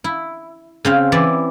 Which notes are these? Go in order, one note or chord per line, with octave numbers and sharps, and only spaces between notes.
E4
C#3 C4 F5
E3 E4 D5